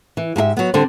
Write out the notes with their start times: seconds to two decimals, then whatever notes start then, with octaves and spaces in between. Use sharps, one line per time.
0.17 E3
0.36 G#2 G4 G#4 E5
0.57 F#3 B3
0.74 D3 G3 C4 C5